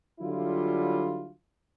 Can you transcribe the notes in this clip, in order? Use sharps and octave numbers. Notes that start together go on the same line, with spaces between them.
D3 F#3 G3 E4 F4